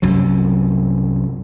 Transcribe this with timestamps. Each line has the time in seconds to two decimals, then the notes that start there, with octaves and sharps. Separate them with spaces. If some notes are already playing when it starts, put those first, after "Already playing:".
0.02 C2 F#2 F#3